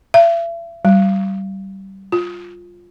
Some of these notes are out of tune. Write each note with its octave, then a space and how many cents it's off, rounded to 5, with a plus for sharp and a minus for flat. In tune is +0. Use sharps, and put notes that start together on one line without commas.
E5 +40
G3 -20
F4 +5